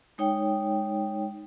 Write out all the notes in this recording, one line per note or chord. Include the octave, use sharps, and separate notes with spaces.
G#3 D#4 C#5 G5